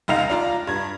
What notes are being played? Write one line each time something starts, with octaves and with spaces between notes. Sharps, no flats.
F1 C#2 D#4 F5 A#6 F7
D4 F4 A#5
G2 G#6